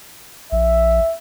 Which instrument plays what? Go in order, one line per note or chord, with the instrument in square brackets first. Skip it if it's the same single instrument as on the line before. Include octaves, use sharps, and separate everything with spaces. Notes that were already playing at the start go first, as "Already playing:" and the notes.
[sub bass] A#1 [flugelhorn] E5